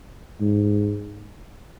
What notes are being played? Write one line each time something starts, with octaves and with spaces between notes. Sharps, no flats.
G#2